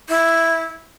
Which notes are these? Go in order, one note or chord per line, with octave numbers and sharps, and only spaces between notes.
E4